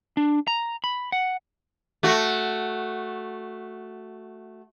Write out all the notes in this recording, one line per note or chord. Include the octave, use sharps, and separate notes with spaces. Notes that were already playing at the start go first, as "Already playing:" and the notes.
D4
A#5
B5
F#5
A3 F#4